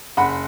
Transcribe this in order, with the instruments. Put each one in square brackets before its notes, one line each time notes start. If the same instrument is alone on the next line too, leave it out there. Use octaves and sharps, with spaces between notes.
[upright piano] F#1 F#5 B5